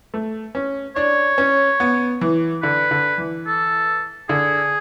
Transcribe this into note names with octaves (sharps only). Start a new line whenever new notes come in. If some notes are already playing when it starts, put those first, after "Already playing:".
A3
C#4
D4 C#5
C#4
B3
E3
D3 B4
D3
E3
A4
D3 G#4